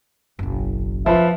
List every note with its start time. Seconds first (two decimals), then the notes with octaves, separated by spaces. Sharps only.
0.39 F#1 B1
1.06 F3 F4 B4 E5